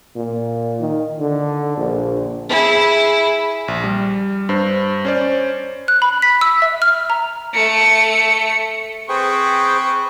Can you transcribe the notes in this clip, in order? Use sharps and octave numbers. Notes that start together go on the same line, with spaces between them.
A#2
D#3
D3
A#1
E4 G#4
A#1
G3
G2 C5
C#4 C5 D5
F#6
B5
B6
E6
E5
F6
A#5
A3 C#7
C4 G#4 B4 C5 G5 C#6